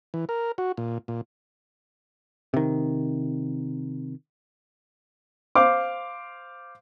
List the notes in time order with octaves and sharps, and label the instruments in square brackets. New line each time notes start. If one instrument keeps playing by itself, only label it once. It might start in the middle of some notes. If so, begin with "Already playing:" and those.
[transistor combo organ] E3
A#4
F#4
A#2
A#2
[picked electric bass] C3 D#3
[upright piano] C5 F5 D6